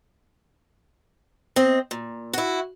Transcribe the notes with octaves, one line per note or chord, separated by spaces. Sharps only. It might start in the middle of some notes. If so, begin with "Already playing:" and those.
C4 D#5
A#2
E4 F#4